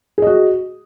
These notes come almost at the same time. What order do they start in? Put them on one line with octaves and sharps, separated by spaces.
G#4 D#5 F#4